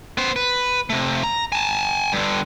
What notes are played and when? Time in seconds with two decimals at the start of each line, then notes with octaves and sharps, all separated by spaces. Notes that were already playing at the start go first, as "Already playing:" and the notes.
0.17 B3 C5
0.36 B4
0.90 C3 A3
1.23 A#5
1.52 G#5 A5
2.13 G2 D3